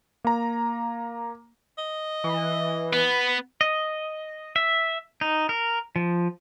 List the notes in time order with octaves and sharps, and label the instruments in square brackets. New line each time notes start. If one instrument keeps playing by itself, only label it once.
[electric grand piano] A#3 A#5
[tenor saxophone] D#5
[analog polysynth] E3
[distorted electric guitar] B3 [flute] B4
[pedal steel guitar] D#5
E5
D#4
A#4
F3